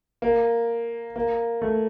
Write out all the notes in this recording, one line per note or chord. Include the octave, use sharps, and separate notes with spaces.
A#3
A#3
A3